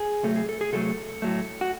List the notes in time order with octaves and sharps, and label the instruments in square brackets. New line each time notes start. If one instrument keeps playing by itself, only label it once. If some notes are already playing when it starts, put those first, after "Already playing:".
Already playing: [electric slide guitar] G#4
C3 F#3 A3 A4
G#4
A4
G#4
C3 F#3 A3 A4
A2 F#3 A3
F#4